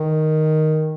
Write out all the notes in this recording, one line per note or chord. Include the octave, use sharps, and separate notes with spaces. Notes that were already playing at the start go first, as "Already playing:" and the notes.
Already playing: D#3